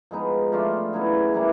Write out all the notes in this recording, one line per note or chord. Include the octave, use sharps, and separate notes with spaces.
F3 G#3 B3 D#4
F3 A3 D4 F4
C#3 F#3 B3 E4
E3 G3 A#3